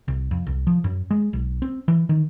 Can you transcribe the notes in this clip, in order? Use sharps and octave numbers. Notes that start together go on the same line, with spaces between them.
C2
F2
C2
F3
F#2
G#3
B1
C4
E3
D#3